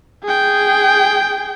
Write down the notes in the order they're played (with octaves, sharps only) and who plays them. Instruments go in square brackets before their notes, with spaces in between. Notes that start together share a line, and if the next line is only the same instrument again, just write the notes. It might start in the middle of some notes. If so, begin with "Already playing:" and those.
[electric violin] G#4 G5